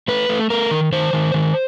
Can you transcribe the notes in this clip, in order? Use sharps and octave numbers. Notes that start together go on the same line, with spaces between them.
A3 B4
A3
A3 A#4
D#3
D#3 C5
D#3
D#3